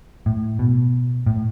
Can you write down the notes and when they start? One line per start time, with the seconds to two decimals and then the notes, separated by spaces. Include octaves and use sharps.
0.26 A2
0.59 B2
1.26 A2